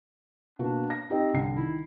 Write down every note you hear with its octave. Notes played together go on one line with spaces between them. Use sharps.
B2 A#3 D4 F#4
A#6
C4 D#4 G4 D#5
C2 D3 C7
D#3 E4